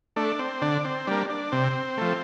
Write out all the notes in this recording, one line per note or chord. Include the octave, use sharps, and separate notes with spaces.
A3 D4
C4
D3 D4
C4
G3 A#3 D4
D4
C3 C4
F3 A3